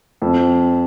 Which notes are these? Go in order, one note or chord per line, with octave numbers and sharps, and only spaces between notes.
F2